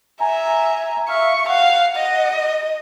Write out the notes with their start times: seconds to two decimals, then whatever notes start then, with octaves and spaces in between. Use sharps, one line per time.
0.21 E5 G#5 A#5
1.09 E5 F5 C#6
1.49 F5 F#5
1.96 D#5